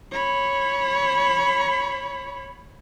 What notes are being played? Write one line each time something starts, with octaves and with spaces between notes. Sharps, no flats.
C#5 B5